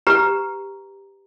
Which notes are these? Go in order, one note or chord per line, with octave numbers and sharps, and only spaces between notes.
G4 B4 A#5